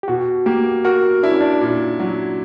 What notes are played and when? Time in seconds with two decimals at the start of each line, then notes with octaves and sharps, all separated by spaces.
0.03 G4
0.08 B2 F#4
0.46 A#3 G4
0.85 F#4 A#4
1.23 D4 E4
1.32 C#4
1.41 D4
1.61 A#2
2.00 F#3